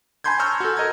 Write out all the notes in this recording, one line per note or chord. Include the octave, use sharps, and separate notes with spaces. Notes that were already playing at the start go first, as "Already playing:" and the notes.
G#5 A5 B5 C6 G6 G#6
A#5 C#6 E6 F6 G6
F#4 A4
A#4 D#5 A#5 G#6